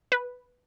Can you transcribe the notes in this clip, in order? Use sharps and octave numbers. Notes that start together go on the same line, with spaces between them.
B4